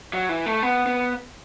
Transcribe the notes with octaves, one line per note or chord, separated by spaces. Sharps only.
F#3
E3
A3
B3
B3